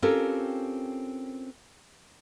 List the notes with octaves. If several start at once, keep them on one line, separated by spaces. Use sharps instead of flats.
C4 C#4 F4 G4 A4 A#4